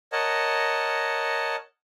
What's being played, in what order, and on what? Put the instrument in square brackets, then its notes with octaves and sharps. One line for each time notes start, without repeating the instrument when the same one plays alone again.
[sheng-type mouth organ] A#4 C#5 D#5 F#5 A5